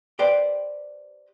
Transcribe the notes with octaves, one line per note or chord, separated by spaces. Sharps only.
G4 B4 C5 D5 G5